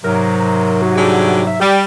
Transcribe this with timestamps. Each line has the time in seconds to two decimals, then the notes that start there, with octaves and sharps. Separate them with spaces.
0.04 G#2 C3 F#3 A#4
0.82 F#4
0.96 D3 G3 F#4 G#4
1.47 E5
1.60 G3 G4